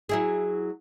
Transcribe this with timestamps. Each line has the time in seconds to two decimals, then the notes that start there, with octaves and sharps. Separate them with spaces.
0.09 F#3 E4 G#4